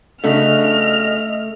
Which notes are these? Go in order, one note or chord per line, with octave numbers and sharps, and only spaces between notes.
C#3 A3 D4 F#4 D#5 F6